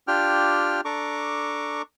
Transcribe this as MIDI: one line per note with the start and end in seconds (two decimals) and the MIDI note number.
0.08 0.81 62
0.08 0.81 65
0.08 0.81 67
0.08 0.81 79
0.08 0.81 89
0.85 1.82 62
0.85 1.82 69
0.85 1.82 82
0.85 1.82 85
0.85 1.82 86